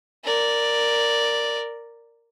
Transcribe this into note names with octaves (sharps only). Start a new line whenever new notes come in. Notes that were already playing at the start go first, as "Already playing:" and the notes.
A#4 D5